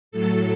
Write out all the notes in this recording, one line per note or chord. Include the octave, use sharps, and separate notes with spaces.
A2 F#3 A4